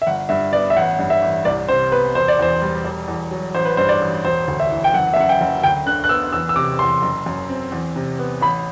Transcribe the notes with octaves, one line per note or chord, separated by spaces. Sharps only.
E5
G1 F#5
G2 E5
B3 D5
E5
A1 F#5
G2
E5
A1
C2 D5
C3 C5
B3 B4
E1 C5
D5
E2 C5
G3
E1
E2
F#3
A1 C5
B4
G2 C5
D5
A1
E1 C5
D2
E5
E3
G5
F#1 F#5
E5
F#2 F#5
G5
F#1
D2 G5
D3 F#6
F#6
B3 E6
E2 E6
E6
C3 D6
E2 C6
F#1
F#2
C4
E2
C3
B3
A1 B5